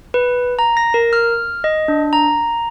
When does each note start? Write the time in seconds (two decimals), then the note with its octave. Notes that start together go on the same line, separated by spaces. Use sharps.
0.14 B4
0.59 A#5
0.77 A#6
0.94 A#4
1.13 F6
1.64 D#5
1.88 D4
2.13 A#5